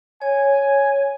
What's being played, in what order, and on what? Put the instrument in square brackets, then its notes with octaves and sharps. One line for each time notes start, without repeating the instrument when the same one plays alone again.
[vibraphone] C#5 [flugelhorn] G#5